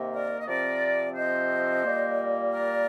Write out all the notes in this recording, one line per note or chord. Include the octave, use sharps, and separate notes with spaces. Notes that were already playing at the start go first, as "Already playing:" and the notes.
Already playing: C3 D#3 A#3
A#4 D5
D#5
C3 F3 C4 A#4 D5
C5 D#5
A#2 G3 A#3
A#4 D5